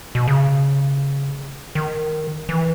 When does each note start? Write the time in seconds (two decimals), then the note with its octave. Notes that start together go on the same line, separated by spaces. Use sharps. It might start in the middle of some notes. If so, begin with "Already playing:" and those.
0.15 B2
0.28 C#3
1.75 D#3
2.49 E3